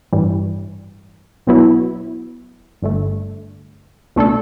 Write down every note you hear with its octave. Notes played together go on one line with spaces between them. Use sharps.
A1 G2 E3 G3
B1 B2 F#3 B3 E4
G1 G2 D3 A3
C#2 B2 A3 D4 A4